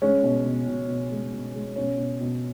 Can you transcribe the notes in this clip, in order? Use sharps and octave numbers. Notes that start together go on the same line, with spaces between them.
G#3 C#4
B2
B2
B2
B2
G#3
B2
G#3
B2 C#4
B2
B2